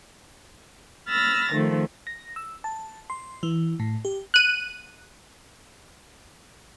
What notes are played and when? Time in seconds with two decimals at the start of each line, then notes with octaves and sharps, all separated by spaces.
1.08 B5 E6 F6 A6 A#6
1.52 D#3 F3 A3
2.07 A#6
2.36 E6
2.64 A5
3.10 C6
3.43 E3
3.80 A2
4.05 G4
4.34 F#6 D#7